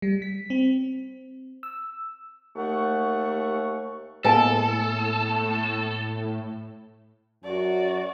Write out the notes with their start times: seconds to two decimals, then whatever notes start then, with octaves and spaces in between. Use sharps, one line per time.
0.02 G3
0.22 B6
0.50 C4
1.63 E6
2.56 D#2 A3 F#5 C#6
4.25 A2 G#3 A#3 B3 A4 B4 G#5 A5
7.44 F#2 F#4 D5